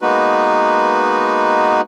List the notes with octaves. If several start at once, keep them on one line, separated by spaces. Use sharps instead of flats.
G#3 A#3 B3 D#4 F#4 B4